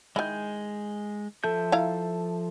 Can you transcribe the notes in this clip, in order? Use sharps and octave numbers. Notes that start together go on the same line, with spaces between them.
D#3 G#3 E4 G#5 G6
F3 A4 E5 G6
E4 F5 A#5